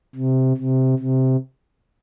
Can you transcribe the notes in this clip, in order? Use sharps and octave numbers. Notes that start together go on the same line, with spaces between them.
C3
C3
C3